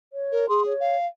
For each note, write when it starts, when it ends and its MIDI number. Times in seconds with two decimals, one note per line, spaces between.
0.13 0.46 73
0.31 0.48 70
0.49 0.73 68
0.49 0.62 84
0.66 0.96 73
0.80 1.06 77